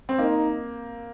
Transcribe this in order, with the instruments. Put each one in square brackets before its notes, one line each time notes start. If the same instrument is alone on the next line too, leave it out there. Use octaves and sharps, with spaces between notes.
[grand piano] C4
[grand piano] A#3 [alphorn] D#4